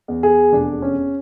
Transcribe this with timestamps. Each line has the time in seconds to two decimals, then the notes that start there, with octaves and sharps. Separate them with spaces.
0.08 E2
0.23 G#4
0.52 F1 D4
0.82 C#4